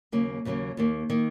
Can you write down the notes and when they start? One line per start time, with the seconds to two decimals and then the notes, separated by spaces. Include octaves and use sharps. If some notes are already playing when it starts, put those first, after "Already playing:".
0.12 D#2 C#3 F#3 A#3
0.45 D#2 C#3 F#3 A#3
0.77 D#2 D#3 A#3
1.10 D#3 A#3